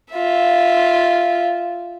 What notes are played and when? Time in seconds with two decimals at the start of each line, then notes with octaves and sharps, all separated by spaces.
0.13 F4 E5